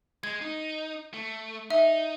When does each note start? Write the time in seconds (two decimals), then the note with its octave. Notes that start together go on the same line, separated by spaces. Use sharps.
0.23 G#3 G#6
0.41 D#4
1.14 A3
1.70 D#4 E5